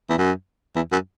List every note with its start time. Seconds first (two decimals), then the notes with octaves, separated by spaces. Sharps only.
0.10 E2
0.18 F#2
0.76 E2
0.92 F#2